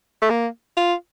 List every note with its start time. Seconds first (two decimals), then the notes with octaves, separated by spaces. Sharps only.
0.22 A3
0.30 A#3
0.77 F4